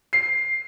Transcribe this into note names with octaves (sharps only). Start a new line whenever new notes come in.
C7